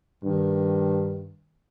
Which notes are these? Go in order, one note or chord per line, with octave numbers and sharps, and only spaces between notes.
G2 D#3